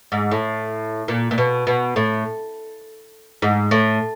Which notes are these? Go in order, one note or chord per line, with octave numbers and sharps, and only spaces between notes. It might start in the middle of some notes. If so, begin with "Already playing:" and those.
G#2
A2
A#2
A#2
B2
B2
A2
G#2
A2